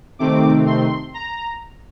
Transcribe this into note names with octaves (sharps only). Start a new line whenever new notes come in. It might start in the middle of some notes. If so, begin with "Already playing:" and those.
C3 D#3 A3 C4 D6
C6
A#5